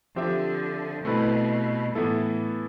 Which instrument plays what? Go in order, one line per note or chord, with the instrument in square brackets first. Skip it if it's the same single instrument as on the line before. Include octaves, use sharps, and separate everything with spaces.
[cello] D3 [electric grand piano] F3 C4 G4 C5 E5
[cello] B2 [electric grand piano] A3 C4 E4 B4
[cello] A2 [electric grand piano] E3 B3 E4 A4